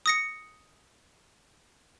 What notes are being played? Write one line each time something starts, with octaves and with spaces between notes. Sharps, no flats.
D#6 A#6 C#7